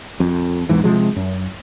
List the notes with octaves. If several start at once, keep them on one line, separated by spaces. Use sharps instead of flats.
F2
A1 E2 G#2 E3
C3 F3 G#3
F#2